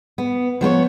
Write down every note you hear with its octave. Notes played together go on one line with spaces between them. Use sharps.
B3
F3 B3 B4 C#5